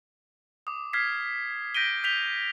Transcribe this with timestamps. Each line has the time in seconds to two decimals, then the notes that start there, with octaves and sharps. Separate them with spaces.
0.67 D6 D#6
0.93 F6 G#6 B6 C7
1.74 G6 A#6 B6 D7 D#7 G7
2.04 G6 B6 F7 G7